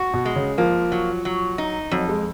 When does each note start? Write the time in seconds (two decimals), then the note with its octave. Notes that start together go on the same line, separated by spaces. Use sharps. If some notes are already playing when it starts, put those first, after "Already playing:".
Already playing: F#4
0.14 B2
0.25 G#3
0.36 C#3
0.58 F3 A#3
0.92 F#3
1.25 F#3
1.58 D#4
1.92 F2 F#3
2.09 G#3